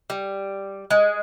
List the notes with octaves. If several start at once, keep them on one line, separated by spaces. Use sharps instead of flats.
G3
G#3